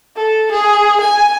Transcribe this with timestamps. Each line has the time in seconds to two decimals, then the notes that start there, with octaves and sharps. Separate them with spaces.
0.17 A4
0.52 G#4
1.01 G#5